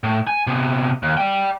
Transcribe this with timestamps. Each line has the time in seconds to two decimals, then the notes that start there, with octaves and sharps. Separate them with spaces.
0.04 A2
0.27 G#5
0.47 C3 B3
1.03 D#2
1.17 D5 G5